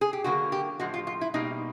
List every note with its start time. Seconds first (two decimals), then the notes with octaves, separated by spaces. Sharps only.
0.01 G#4
0.13 G4
0.24 D3 F#3 A#3 F#4
0.52 G4
0.80 A2 F3 G#3 F#4
0.94 F4
1.07 F4
1.21 E4
1.34 B2 G3 A#3 D#4